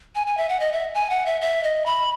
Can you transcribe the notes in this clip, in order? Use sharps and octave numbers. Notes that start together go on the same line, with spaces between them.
G#5
G#5
E5
F#5
D#5
E5
G#5
F#5
E5
E5
D#5
B5